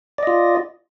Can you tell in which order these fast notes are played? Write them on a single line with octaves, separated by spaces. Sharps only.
D5 D#5 F4